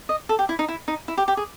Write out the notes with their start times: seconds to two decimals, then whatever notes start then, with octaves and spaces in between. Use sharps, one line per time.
0.09 D#5
0.29 A4
0.39 G4
0.49 E4
0.59 D#4
0.69 E4
0.88 D#4
1.08 E4
1.18 G4
1.28 G4
1.37 G#4